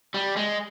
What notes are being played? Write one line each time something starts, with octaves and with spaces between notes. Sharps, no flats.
G3
G#3